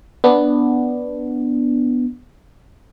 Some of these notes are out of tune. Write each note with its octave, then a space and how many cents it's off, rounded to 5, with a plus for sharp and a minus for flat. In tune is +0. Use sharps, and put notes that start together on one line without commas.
B3 +0 D4 +0